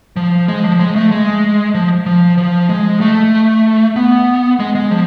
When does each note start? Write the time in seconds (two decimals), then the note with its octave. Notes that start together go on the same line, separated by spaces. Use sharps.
0.16 F3
0.48 G#3
0.64 F3
0.80 G#3
0.96 A3
1.11 G#3
1.74 F3
2.06 F3
2.38 F3
2.69 G#3
3.01 A3
3.96 B3
4.60 G#3
4.75 G#3
4.91 F3